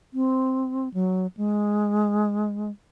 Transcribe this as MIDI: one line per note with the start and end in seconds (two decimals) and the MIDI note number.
0.14 0.89 60
0.94 1.27 54
1.37 2.71 56